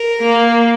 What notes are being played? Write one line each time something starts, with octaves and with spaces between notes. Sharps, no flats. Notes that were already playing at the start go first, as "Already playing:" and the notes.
Already playing: A#4
A#3